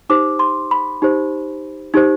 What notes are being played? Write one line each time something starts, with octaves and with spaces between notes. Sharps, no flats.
D#4 G4 C5 D6
C6
B5
D#4 G4 C5
D#4 G4 C5